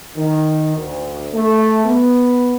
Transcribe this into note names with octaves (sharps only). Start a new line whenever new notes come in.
D#3
D2
A3
B3